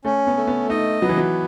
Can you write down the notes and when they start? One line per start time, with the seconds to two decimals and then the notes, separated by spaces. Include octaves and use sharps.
0.05 A3 C#4
0.27 B3
0.37 A3
0.47 B3
0.69 D#4 D#5
1.02 F#3 B3
1.09 E3
1.18 F#3